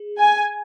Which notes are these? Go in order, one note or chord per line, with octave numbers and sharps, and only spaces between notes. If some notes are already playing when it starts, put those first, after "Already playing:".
Already playing: G#4
G#5